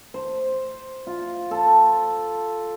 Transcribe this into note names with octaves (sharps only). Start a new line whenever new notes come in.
C5
F4
A4